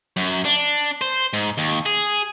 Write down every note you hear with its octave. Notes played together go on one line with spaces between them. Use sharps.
F#2
D4
C5
G#2
D#2
G#4